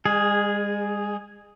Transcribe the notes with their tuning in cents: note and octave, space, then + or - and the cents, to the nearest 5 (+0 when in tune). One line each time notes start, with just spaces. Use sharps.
G#3 -40 G#4 +0